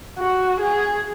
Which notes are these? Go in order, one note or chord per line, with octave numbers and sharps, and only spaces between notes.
F#4
G#4